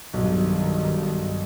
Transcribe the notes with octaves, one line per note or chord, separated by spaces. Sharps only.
B1 G2 D#3